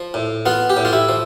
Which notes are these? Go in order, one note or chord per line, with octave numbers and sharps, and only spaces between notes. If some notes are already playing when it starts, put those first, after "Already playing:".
Already playing: F3
A2
B3 F4
G4
A2
F4
E4
F3